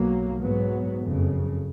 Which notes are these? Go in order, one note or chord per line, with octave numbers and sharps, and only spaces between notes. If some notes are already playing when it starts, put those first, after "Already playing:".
Already playing: B1 B2 F#3 A#3
G#2 F#3 B3
F#1 F2 C#3